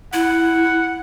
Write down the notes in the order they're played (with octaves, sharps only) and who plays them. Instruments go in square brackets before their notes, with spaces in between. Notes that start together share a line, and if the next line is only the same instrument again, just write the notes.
[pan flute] E4 [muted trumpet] F#5